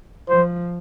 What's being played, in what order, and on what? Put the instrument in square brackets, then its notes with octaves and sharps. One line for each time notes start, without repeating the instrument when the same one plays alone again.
[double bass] F3 [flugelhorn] C5